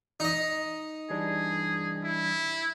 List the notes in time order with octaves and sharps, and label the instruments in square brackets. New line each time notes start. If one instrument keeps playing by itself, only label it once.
[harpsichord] D#4 D#5
[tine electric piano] E3 G3 D4 [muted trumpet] G#4
[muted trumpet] E4